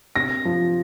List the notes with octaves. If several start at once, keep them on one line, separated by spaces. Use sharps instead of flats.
C3 A#6
F3